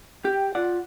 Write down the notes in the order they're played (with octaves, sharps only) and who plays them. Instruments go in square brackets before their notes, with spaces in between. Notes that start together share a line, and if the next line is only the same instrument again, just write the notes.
[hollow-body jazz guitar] G4 [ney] G5
[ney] F4 [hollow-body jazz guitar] D5 F#5